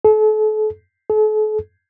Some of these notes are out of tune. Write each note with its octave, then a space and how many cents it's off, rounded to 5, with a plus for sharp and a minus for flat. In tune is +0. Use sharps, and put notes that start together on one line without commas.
A4 -40
A4 -45